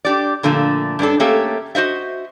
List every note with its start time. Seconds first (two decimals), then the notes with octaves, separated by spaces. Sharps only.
0.05 D4 G4 D5
0.43 A#2 D3 F3 A3
0.99 G2 C#4 D4 A4
1.20 A3 A#3 C#4 G4 A4 E5
1.75 F#4 C5 D#5 E5